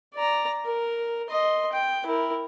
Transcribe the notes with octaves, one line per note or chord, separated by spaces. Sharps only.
D5 A#5
A#4
D#5 C6
G5
E4 A#4